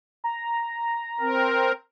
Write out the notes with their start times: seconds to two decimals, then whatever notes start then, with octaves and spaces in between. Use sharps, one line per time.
0.24 A#5
1.20 C4 A#4